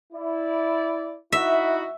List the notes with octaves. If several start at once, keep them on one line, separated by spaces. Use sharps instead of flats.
E4 D5
D#4 E4 F#4 E5